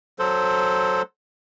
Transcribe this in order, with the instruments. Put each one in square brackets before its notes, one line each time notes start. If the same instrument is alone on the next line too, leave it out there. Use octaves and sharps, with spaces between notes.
[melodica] F#3 A4 C5